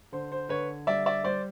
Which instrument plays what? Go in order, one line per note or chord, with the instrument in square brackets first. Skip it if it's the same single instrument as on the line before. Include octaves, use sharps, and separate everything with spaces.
[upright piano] D3 C5
C5
D3 B4 C#5
G3 D5 E5
D5 E5
G3 C5 D5